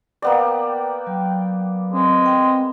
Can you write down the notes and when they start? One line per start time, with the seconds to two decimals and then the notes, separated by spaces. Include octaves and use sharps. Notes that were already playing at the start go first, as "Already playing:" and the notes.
0.22 A#3 B3 D5 G5
1.07 F#3
1.93 G#3 C4
2.26 G5